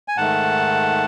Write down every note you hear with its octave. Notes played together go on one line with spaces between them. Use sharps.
G#5
G#2 D#3 A3 F#5 A5